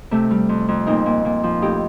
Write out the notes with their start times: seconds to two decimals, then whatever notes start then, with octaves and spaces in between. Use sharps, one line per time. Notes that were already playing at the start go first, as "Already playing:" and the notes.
0.11 C3 A3
0.31 G3
0.49 F2
0.68 F2
0.86 A#2 C4 D#4
1.06 A#2
1.25 A#2
1.43 F3
1.62 A2 D#4 G4